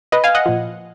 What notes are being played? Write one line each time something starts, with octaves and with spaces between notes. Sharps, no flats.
B4 D#5
F5 G#5
D#5 F#5
A#2 F3